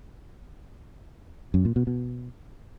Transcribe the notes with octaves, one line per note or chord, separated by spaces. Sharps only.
F#2
A#2
B2
B2